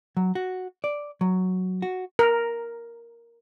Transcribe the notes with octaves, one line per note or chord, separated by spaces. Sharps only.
F#3
F#4
D5
F#3
F#4
A#4